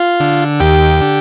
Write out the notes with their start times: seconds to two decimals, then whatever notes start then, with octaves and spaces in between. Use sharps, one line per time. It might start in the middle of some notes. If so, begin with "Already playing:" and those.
Already playing: F4
0.20 D3
0.60 D#2 G4
1.01 D3